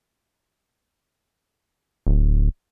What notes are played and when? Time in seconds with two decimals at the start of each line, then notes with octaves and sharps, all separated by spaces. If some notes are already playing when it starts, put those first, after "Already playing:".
2.07 D1